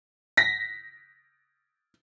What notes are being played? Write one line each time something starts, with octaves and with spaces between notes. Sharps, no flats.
A#6 B6